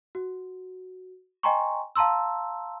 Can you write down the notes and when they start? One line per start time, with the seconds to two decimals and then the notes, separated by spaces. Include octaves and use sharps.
0.15 F#4
1.43 D#5 G5 G#5 A#5 C6 C#6
1.96 F5 A5 A#5 C6 E6